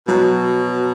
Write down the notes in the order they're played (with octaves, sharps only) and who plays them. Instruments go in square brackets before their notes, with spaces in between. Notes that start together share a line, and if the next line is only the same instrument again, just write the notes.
[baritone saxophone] B2 [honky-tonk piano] F#3